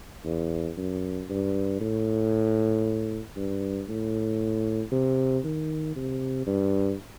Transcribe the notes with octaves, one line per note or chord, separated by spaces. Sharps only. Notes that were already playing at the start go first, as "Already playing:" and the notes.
E2
F#2
G2
A2
G2
A2
C3
D#3
C3
G2